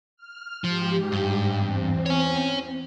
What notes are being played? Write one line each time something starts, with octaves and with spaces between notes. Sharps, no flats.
F6
G#2 F3 G4
G2
E2 C4
C#5 G#5